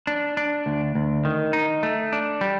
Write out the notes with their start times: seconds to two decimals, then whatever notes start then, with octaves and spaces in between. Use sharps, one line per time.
0.07 D4
0.37 D4
0.66 D2
0.95 D2
1.25 D#3
1.53 D#4
1.83 A3
2.12 D4
2.41 G3